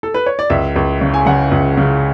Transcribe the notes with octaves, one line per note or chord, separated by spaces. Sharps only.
A4
B4
C#5
D5
C#2 E5
C#2
C#3
G#5
C#3 F#5
C#2
C#3